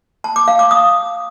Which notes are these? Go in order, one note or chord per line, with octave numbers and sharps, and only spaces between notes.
A5
D6
F5
D6
D#6